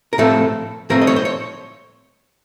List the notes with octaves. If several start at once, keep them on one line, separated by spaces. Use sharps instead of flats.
A#4
A2 F3 A3 C4 A4
A2 F3 A3 C4 A#4
D#5
C#5
C5
C#5